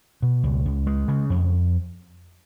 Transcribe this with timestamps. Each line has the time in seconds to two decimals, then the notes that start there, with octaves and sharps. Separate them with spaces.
0.22 B2
0.44 C#2
0.65 C#2
0.87 G#3
1.08 C#3
1.30 F2